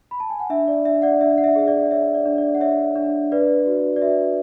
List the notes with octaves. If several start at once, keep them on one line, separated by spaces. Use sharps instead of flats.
B5
A5
G#5
F#5
D4 E5
D5
D4 E5
D5 F#5
D4 E5
F#5
E5
G#4 E5
D5
C#5 E5
D5
D4
D5
F#5
C#5 E5
D4
B4 D5
F#4
D5
F#4 E5